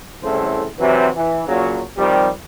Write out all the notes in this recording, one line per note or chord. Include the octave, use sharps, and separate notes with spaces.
C2 A2 C#3 E3 A4 C5
C3 E3 F#3
E3
A#2 C#3 F#3
C3 D#3 F3 G3